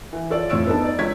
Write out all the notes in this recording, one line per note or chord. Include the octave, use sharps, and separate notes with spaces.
E3
F4 A4 C#5 D5
F2 A2 F4 C#5 E6 D7
B3 D4 D#4 A4 A5
D#4 D5
C#2 C#5 G#6 B6